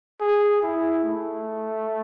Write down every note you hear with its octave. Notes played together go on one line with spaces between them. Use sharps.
G#4
E4
A3